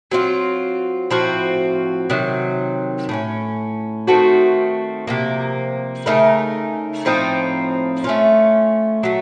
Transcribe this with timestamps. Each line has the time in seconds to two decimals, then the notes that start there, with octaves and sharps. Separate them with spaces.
0.11 F#3 C4 F4
1.11 A2 F3 C4 F#4
2.10 C3 D#3 F#3
3.09 A2 A3 C#4
4.07 D#3 A3 C4 F#4
5.07 C3 F3 A#3
6.06 C#3 A3 D#4 A#4
7.05 A2 F3 C4 D#4
8.04 A3 C#4 F4
9.03 F#3 A3